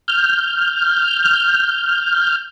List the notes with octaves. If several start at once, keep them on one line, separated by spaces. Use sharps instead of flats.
F6 G6